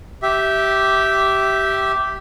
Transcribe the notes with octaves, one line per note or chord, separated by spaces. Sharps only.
G4 E5